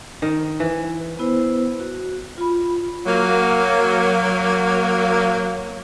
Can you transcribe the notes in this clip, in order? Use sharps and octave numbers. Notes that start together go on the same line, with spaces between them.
D#3
E3
B3 E4 B4 C5
F#4
F4 B5
F#3 A#3